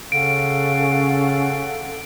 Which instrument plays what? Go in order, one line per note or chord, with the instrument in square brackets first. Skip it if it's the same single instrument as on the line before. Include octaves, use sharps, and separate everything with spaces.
[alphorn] C#3 [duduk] C#4 [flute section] A4 F5 F#5 [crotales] D7